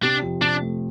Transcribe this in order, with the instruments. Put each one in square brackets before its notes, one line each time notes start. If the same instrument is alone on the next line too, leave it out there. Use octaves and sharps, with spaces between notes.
[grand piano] C3 [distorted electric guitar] D4
[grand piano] F2
[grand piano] C3 [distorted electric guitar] D4
[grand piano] A3